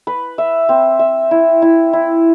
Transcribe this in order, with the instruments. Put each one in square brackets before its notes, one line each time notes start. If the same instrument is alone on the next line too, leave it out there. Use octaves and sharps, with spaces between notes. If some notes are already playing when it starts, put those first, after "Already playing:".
[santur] B4
E5
C4
E5
E4
E4
E4